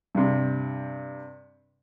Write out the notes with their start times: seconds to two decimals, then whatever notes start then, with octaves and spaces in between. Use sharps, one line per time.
0.15 G2 C3